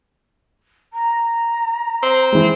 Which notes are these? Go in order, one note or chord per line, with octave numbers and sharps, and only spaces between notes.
A#5
C4
E3 G#3